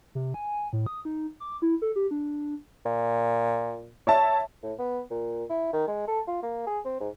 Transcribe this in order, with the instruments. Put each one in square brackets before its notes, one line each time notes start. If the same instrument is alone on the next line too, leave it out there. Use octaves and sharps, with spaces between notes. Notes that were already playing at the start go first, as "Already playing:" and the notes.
[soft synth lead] C3
G#5
A2
D#6
D#4
D6
E4
A4
G4
D4
[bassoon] A#2
[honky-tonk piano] C#5 E5 A5
[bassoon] A2
B3
A#2
E4
D#3
G#3
A4
F4
A#3
G#4
C4
G#2